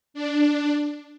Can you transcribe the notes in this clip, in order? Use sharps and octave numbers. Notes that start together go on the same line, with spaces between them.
D4